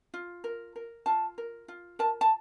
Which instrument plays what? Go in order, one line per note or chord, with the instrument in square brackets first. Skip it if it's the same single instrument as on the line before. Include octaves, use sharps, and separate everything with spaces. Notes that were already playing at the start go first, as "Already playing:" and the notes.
[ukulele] F4
A#4
A#4
F4 A5
A#4
F4
A#4 A5
A5